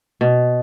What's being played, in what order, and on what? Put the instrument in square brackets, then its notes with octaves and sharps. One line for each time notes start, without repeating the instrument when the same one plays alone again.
[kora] B2